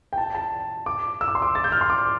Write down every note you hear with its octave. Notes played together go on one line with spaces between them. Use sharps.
G5
A5
A5
D6
E6
D6
C6
D6
A6
G6
F6
C6
D6